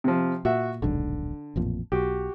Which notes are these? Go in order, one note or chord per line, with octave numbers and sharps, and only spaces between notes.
C3 F3
A#2 F#4 E5 F#5
D#1 B1 G#2 D3
A1 F2 A#2
B1 F#4 G4